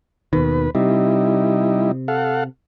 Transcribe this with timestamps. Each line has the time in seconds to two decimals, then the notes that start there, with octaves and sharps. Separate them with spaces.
0.33 D#2 B2 D#3 B4
0.75 C3 G3 D#4 E4
2.08 A4 F5 F#5